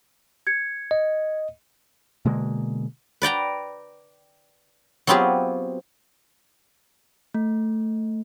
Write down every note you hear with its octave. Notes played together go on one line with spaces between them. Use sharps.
G#6 C#7
D#5
B2 D3 G#3 A#3
B4 D5 G5 A#5
F#3 B3 C4 F4 G4 G#4
A3